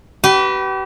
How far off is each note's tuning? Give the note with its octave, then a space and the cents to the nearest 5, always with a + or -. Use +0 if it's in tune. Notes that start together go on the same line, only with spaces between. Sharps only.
G4 -40 B4 +0